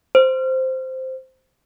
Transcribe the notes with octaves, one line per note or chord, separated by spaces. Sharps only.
C5